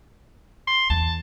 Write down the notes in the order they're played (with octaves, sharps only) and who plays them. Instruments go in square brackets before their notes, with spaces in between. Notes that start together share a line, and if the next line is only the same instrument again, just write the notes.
[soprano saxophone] C6
[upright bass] E2 [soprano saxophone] A5